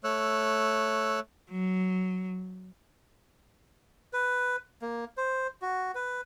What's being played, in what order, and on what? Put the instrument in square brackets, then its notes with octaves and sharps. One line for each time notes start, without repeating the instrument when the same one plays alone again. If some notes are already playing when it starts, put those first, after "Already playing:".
[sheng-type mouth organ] A3 C#5 E6 F#6
[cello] F#3
[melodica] B4
A#3
C5
F#4
B4